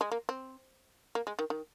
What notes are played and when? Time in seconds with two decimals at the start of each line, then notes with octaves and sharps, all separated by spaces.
0.01 G#3
0.12 A#3
0.29 C4
1.15 A#3
1.27 G#3
1.39 D#3
1.50 D#3